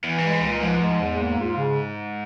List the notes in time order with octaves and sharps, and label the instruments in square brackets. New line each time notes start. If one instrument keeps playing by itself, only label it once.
[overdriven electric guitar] E2 [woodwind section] E3
[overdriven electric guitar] G2 [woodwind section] G#3
[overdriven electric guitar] G#2
[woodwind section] C#2 [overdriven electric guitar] C3
[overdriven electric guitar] A#2
[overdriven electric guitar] G#2 [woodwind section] F3
[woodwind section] G#3
E2
A#3
F4
C#3